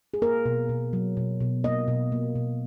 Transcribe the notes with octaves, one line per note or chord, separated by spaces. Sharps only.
G#4
A#3 A#4
B2
B2
F#3
B2
B2
A#3 D#5
B2
A#3
B2